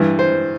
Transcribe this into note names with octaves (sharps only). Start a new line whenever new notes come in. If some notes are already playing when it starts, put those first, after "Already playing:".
Already playing: G2 E3
C5